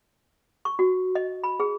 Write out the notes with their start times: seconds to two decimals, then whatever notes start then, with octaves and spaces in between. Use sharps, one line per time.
0.65 C#6
0.79 F#4
1.15 D#5
1.44 B5
1.60 G#4